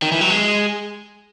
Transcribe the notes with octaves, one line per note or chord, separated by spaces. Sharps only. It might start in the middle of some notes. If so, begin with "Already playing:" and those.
D#3
E3
F#3
G#3